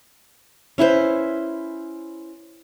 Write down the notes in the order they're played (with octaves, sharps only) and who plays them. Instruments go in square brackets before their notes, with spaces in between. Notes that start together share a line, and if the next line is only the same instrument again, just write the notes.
[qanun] C#4 E4 B4 C5